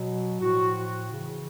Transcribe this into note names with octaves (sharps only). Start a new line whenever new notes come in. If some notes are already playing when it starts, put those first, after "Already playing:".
Already playing: B2 F#3
A2 F3 F#4
C#3 E3